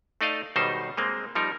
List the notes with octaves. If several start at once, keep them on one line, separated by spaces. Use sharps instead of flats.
A3 D#4 D5 D#5 F5
B1 B2 D#3 G3 D#4 C5
G#3 A#3 C4
F3 G3 D#4 A#4